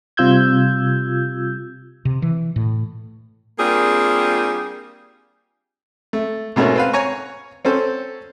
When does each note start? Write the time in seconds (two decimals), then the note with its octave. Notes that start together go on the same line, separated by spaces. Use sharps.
0.17 C3 G3 F4 E6 G6 G#6
2.05 C3
2.22 E3
2.56 A2
3.59 G3 A#3 C4 D4 F4 G#4
6.13 A3
6.56 G#2 B2 A3 A#3 C#4
6.76 C4 B4 F5
6.93 C#5 G#5 A#5 C#6
7.65 C4 C#4 A4 C5